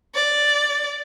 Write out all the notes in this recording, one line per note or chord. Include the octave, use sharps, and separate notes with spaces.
D5